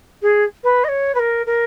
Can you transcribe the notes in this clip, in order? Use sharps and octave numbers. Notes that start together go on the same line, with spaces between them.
G#4
B4
D#5
C#5
B4
A#4
A#4